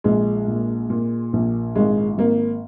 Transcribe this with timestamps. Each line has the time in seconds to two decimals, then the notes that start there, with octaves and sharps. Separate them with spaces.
0.04 A#1 G#3
0.48 A#2
0.90 A#2
1.33 A#1
1.76 G#1 G#3
2.18 G#1 A#3